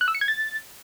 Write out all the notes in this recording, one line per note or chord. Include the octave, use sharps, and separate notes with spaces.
F#6
E6
C#7
G#6
A6